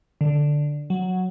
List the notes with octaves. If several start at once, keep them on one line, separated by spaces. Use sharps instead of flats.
D3
F#3